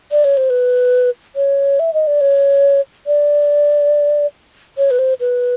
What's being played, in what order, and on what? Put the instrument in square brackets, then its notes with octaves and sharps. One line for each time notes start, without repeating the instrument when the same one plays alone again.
[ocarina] D5
C#5
C5
B4
C#5
E5
D#5
D5
C#5
D5
C#5
B4
C5
B4